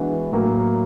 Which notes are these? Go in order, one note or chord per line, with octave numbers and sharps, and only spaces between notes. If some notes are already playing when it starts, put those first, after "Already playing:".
Already playing: E3 G#3 B3 D4 F#4
A2 F#3 A#3